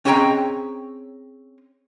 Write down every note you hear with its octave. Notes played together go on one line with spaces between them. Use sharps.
C4 C#4 G#4 D#5 G5 A#5